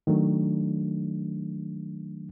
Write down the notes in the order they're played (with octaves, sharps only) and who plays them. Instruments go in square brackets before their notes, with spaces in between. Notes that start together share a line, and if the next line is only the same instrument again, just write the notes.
[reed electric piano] D#3 F#3 A3 D4